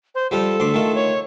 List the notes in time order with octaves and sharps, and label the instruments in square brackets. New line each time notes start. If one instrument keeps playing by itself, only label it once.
[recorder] C5
[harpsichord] F3 G3 F4 [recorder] A4
[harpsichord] D2 C6 D6
D#3 A3 F4
[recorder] C#5